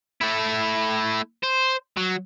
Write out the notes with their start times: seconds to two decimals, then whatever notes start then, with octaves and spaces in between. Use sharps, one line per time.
0.21 A3 E4
1.43 C5
1.97 F#3